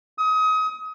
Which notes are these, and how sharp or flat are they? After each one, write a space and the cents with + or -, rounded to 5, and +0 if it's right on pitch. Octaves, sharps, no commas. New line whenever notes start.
D#6 +30